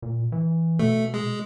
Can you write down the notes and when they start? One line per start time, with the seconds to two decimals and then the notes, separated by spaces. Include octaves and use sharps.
0.02 A#2
0.32 E3
0.79 B2 A3
1.14 G#3